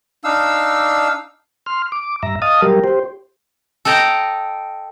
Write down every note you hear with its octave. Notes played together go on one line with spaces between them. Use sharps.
D4 D#4 F5 E6
C6 F6
D6
G2 E5 A#5
D#5 F5 A5 D#6
F#3 G3 G4 A#4
G4 C5
A4 D#5 G5 A5 A#5